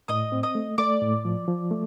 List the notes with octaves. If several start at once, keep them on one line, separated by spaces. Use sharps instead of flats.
A2 D#5 D#6
C4
D#5 D#6
A3
A3 D5 D6
A2
F3
F3
A3